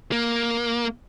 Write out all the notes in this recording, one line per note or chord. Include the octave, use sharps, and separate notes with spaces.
A#3